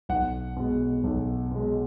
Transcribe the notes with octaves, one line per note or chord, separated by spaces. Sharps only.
B1 F#5
B2 G#3
B1
B2 G#3